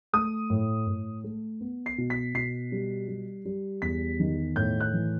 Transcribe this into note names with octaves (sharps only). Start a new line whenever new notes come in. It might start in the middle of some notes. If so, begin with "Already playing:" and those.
A3 D#6
A2
A2
A3
B3
C7
B2
B6
B2 C7
G3
G3
G3
E2 B6
D#3
A2 G6
F#6
E3